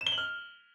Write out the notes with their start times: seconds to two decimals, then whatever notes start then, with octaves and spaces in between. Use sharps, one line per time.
0.01 E7
0.07 G7
0.12 F#7
0.18 F6